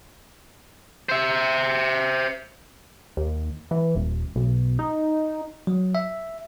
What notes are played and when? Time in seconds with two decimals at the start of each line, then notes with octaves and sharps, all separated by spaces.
1.09 C5 E5
3.17 D#2
3.71 E3
3.95 D#1
4.36 B1
4.79 D#4
5.67 F#3
5.95 E5